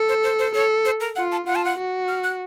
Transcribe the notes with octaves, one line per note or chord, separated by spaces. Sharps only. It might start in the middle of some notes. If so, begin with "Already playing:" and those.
Already playing: A4
C5
C5
C5
A4 C#5
C5
A#4
F4 F#5
A5
F4 F#5
A5
F#5
F#4
F6
F#6